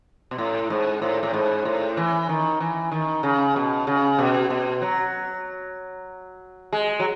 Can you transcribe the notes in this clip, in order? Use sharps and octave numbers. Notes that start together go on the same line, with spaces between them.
B2
A2
G#2
A2
A2
G#2
A2
E3
D#3
E3
D#3
C#3
B2
C#3
B2
B2
F#3
G#3
F#3